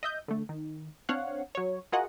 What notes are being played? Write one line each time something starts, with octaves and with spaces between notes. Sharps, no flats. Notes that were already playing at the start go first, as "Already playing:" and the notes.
D#5 E5 G6
D3 A3
D#3
C4 D4 C#5 F5 F#5
F#3 C#5
F4 F#4 G#4 A#4 D#5 F#5